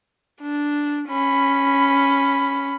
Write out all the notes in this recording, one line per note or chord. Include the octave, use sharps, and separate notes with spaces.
D4
C#4 B5